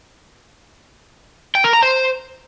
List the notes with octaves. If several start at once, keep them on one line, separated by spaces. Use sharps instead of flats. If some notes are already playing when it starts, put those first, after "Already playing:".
G5
A#4
A#5
C5